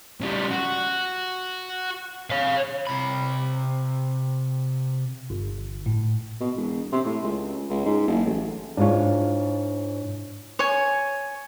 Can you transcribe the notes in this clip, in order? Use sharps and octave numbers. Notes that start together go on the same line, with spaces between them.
C#3 G3
F#4
C#5 F5
C3 B5
G1
A2
B2
E1
C3
A2
C#2
C#2
G#2
F#1
A1
G#2 D4 E4 F4 C#5
C#5 G#5